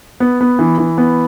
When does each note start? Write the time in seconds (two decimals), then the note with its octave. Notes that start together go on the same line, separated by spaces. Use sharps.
0.20 B3
0.41 B3
0.59 E3
0.78 E3
0.98 B3